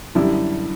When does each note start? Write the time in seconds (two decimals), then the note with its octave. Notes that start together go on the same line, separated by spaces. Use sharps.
0.15 F#2 D3 G3 E4